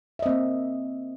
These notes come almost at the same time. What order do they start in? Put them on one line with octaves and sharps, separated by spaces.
E5 D#5 C4 A#3